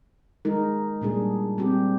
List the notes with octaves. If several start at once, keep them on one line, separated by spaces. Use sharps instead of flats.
G#3 D#4 A#4
A#2 G3 D4 G#4
G3 C4 G4